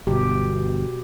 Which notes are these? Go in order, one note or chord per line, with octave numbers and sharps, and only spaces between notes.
G1 B2 G4